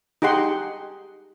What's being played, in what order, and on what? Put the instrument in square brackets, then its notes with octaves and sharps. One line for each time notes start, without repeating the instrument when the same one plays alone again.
[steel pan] D#4 G4 G#4 F#5 C6